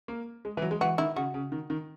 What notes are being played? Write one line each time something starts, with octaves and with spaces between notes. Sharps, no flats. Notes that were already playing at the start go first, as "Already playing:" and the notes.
A#3
G#3
E3
F#3
G#3
E3 F#4
D#3 E4
C#3 F#4
C#3
D#3
D#3